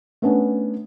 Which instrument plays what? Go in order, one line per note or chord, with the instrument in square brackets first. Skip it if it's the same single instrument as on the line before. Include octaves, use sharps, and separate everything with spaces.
[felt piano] A3 B3 C#4 D4